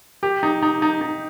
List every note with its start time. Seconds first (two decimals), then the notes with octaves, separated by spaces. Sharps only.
0.23 G4
0.43 D#4
0.63 D#4
0.82 D#4
1.01 D#4